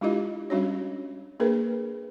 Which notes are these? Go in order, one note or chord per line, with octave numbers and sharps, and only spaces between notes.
G#3 D4 E4 F4 G4 D#5
G3 C#4 D4 F#4 C#5
A#3 D4 G#4 A#4 B4